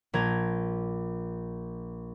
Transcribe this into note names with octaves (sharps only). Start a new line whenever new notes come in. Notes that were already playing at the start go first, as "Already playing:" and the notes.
A#1 A#5 G#6